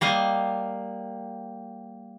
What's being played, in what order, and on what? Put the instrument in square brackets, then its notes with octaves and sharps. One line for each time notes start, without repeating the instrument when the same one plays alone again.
[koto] G3 A#3 D#5 F5